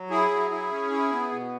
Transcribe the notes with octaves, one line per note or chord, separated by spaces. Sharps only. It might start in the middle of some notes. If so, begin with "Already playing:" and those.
Already playing: F#3
E4 G#4
F#3
E4
C#4
E4
B3
B2